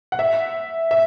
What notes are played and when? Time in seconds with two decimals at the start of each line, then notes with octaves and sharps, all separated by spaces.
0.12 F#5
0.19 E5
0.91 E5